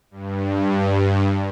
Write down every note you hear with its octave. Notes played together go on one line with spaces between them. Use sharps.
G2